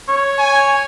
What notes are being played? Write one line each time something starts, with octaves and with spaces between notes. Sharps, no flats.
C#5
G#5